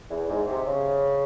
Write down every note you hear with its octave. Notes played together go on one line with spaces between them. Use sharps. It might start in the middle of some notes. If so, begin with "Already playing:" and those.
E2
G#2
C3
C#3